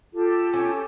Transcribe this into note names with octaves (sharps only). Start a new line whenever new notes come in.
F4 G4 A4
C#4